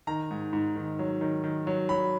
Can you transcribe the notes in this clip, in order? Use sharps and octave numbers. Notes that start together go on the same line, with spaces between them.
D#3 A#5
G#2
G#2
D#3
F#3
D#3
D#3
F#3
F#3 B5